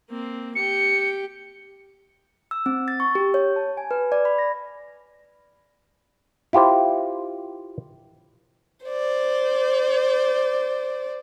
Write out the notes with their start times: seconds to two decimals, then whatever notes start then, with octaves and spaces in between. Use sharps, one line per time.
0.10 A#3 C4
0.55 G4 G5 C#7
2.51 E6
2.66 C4
2.88 A6
3.00 C#6
3.15 G4
3.34 C#5
3.56 A5
3.77 G#5
3.91 B4
4.12 D5
4.25 B5
4.39 A#6
6.53 E4 F4 G4 C5
8.86 C5 D5